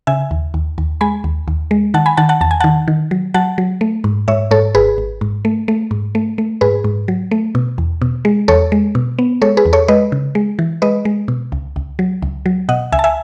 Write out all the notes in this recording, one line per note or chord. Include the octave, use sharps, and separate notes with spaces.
C#3 E5 G#5
D#2
D#2
D#2
G#3 G#5 B5
D#2
D#2
G#3
D#3 F#5 A5
G#5 B5
D#3 F#5 A5
F#5 A5
E2 A5
G#5
D#3 F#5 A5
D#3
F#3
F#3 F#5 A5
F#3
A3
G#2
G#2 C#5 E5
G#2 A4 C#5
G#1 G#4 B4
G#1
G#2
A3
A3
G#2
A3
A3
G#2 G#4 B4
G#2
F#3
A3
B2
E2
B2
G#3
E2 A4 C#5
G#3
B2
B3
G#3 A4 C#5
G#4 B4
E2
A4 C#5
G#3 B4 D#5
C#3
G#3
E3
G#3 B4 D#5
G#3
B2
C#2
C#2
F#3
C#2
F#3
B2 D#5 F#5
C#2 E5 G#5
A5
E5 G#5